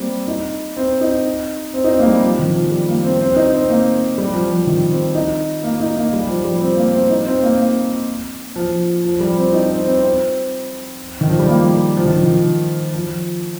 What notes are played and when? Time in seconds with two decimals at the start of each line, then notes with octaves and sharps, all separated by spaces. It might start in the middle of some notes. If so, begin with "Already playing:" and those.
Already playing: G3 A#3 C4
0.28 D#4
0.77 C4
1.01 D#4
1.74 C4
1.84 D#4
1.91 C4
1.99 A#3
2.06 G3
2.23 F3
2.39 D#3
2.55 F3
2.71 G3
2.88 A#3
3.04 C4
3.20 C4
3.36 D#4
3.53 C4
3.69 A#3
4.18 G3
4.33 F3
4.50 F3
4.67 D#3
4.91 C4
5.15 D#4
5.63 A#3
5.80 D#4
5.96 A#3
6.13 G3
6.28 F3
6.45 G3
6.61 C4
6.77 A#3
6.94 C4
7.10 D#4
7.26 C4
7.42 A#3
7.58 A#3
8.56 F3
9.04 F3
9.20 G3
9.37 C4
9.53 D#4
9.70 C4
9.85 C4
10.02 C4
11.21 D#3
11.29 F3
11.39 G3
11.48 A#3
11.64 G3
11.97 F3
12.06 D#3
12.23 D#3
12.94 F3